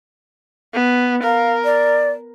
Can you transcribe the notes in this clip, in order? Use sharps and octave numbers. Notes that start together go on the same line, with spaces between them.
B3
A#4 F5
D5